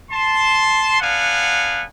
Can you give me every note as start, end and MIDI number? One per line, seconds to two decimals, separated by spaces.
0.11 1.00 81
0.11 1.00 84
1.00 1.84 59
1.00 1.84 62
1.00 1.84 77
1.00 1.84 78
1.00 1.84 80